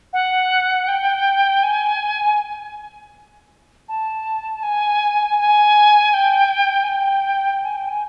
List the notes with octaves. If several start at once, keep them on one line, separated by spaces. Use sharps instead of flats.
F#5
G5
G#5
A5
G#5
G#5
G5
G#5
G5
G#5
G5
G#5